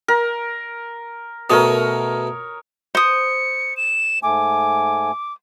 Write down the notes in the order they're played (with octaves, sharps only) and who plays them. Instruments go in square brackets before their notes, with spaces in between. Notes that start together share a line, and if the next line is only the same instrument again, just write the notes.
[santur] A#4
[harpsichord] B2 A3 [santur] A#4 C#5 D#6
[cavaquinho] C5 D#6 [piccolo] C#7
[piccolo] E7
[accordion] G#2 A3 G#5 [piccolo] D6